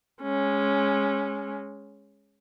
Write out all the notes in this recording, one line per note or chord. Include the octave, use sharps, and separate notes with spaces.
G#3 C#4